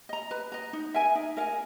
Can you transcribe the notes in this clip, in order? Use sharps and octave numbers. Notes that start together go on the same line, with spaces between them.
D#5 A#5
B4
D#5 A#5
D#4
A#4 E5 G#5
D#4
A#4 E5 G#5